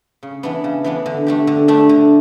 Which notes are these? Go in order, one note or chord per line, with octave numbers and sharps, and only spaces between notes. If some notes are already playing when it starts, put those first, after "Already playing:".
C#3
E3 B3 D4
C#3
E3 B3 D4
D3
A3 D4 G4
D3
A3 D4 G4
D3